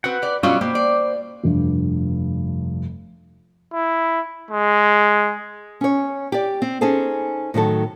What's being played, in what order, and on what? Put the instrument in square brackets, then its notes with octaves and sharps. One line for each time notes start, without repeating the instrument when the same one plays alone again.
[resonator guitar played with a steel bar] C4 F#4 [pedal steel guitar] B4 F#5
[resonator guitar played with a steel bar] G4 D5
[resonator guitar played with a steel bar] B2 C#4 D4 [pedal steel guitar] F#3 G3 C#6 [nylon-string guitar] F4
[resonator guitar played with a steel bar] B2 [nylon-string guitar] A#3 [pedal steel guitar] C5 G5 D6
[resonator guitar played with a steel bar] D5
[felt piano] F1 G2
[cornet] E4
G#3
[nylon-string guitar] C#4 C#5
G4 D5
C4
C#4 D#4 G#4 A4 C5
A2 D#3 F#3 A4